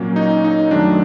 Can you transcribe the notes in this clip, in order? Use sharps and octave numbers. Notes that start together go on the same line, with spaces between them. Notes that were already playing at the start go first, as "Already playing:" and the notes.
Already playing: A#2 F#3 A#3 C#4
D#4
D#4
F#2 D#3 F#3 A3 D4